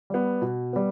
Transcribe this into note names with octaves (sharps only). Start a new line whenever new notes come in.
G3 B3
B2
G3 B3